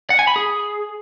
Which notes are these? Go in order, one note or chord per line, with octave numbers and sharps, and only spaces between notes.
F#5
G#5
B5
G#4